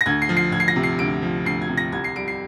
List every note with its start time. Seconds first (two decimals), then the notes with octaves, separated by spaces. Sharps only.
0.01 A#6
0.06 D2 G#6
0.22 C7
0.29 F3
0.37 C7
0.52 D2 G#6
0.60 C7
0.68 A#6
0.76 C3
0.83 C7
0.99 D2 D7
1.22 F3
1.45 D2 C7
1.62 G#6
1.69 C3
1.77 A#6
1.92 C2 G#6
2.04 C7
2.16 G3 D7
2.28 C7